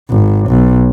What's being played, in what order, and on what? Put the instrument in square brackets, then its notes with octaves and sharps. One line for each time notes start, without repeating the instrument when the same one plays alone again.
[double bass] G#1
B1